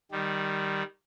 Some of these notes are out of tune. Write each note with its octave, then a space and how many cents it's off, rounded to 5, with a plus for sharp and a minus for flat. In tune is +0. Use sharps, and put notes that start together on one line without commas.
D#3 -10 G3 +0